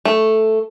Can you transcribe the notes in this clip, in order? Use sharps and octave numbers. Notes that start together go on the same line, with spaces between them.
A3